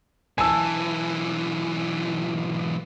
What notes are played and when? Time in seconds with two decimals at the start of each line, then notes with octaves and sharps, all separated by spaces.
0.38 B1 E3 G#5 A5 E6